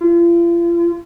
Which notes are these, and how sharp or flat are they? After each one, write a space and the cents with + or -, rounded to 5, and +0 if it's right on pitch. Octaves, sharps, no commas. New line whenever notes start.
F4 -40